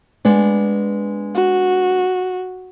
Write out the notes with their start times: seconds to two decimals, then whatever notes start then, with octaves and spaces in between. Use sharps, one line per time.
0.25 G#3 B3 D4
1.35 F#4